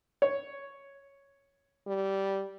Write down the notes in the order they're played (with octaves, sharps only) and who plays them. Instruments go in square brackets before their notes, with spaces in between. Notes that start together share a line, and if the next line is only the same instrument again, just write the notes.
[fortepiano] C#5
[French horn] G3